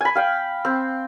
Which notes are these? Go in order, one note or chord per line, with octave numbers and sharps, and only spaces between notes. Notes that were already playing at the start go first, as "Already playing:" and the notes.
G#5 B5
F5 G5
C4